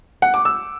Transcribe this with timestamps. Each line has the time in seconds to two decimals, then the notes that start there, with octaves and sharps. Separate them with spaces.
0.22 F#5
0.34 D6
0.45 E6